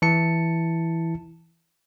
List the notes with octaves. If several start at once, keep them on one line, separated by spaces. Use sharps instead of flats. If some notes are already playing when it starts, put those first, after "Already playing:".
E3 E4 A5 C#7